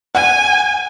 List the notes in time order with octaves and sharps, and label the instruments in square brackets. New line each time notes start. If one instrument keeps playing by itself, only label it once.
[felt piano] F#5 [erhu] G#5